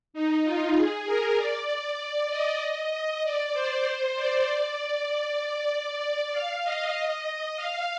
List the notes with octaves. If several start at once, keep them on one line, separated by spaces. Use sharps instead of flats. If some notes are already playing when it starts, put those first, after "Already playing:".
D#4
F4
G#4
A#4
D5
D#5
D#5
D5
C5
C5
D5
D5
D5
F5
D#5
D#5
F5